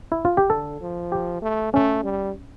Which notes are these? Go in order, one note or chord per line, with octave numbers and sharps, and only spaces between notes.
E4
F4
G4
D3 A4
F3
G4
A3
A3 C#4
G3